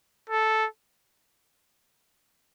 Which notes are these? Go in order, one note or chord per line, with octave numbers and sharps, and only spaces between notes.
A4